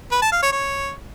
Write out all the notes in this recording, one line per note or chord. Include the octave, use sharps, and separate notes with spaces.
B4
A5
F5
C#5
C#5